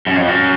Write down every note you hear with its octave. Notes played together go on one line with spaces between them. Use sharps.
F#2
F2
F#2